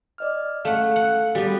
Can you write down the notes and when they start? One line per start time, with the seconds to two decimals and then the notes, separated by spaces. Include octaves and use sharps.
0.18 D5 D#5 F6
0.65 A3 F5 F#5
0.96 F#5
1.35 G3 B3 F#4 G#4